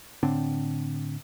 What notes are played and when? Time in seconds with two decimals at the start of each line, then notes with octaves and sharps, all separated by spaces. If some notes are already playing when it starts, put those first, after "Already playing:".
0.23 A2 D3 C4 D4